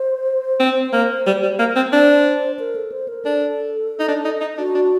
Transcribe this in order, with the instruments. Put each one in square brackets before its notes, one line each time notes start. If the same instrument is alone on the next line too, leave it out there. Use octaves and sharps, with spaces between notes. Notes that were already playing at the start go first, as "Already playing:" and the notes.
Already playing: [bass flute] C5
[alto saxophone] C4
A#3
G3
G3
A#3
C4
[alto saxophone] D4 [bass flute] C5
[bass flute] A#4
A4
C5
A#4
[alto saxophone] D4 [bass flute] A4
[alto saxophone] D#4
D4
D#4
D#4
[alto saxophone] D4 [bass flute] F#4
[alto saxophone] D4